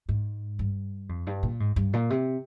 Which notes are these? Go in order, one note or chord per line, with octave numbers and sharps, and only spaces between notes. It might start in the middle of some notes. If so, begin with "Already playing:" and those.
G#2
G2
F2
G2
A#2
G#2
G2
A#2
C3